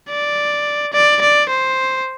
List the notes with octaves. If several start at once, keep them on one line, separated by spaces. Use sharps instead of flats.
D5
D5
D5
C5